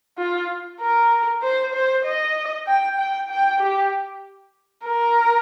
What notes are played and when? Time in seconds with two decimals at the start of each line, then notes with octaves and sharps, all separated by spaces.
0.18 F4
0.80 A#4
1.42 C5
1.74 C5
2.05 D#5
2.67 G5
2.98 G5
3.30 G5
3.61 G4
4.85 A#4